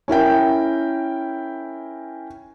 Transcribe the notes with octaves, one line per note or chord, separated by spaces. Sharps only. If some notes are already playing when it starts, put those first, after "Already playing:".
C#4 E4 A#4 G5